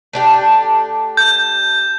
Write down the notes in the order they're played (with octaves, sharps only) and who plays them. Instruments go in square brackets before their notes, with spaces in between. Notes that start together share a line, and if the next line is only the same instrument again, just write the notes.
[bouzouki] A3 D4 G4
[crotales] G6